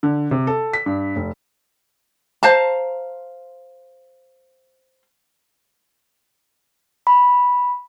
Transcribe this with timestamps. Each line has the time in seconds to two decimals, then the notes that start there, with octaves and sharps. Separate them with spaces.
0.03 D3
0.31 C3
0.47 A4
0.73 B6
0.86 G2
1.16 F1
2.43 C5 F5 A5 A#5
7.07 B5